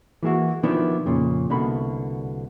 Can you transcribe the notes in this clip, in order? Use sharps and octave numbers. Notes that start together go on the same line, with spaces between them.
E3 G#3 A#3 E4 F#4
B2 D#3 F3 B3 D4 E4
F2 A#2 C#3
C2 B2 D3 A#3 B5